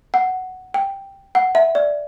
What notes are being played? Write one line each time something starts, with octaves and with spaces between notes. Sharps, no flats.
F#5
G5
F#5
E5
D5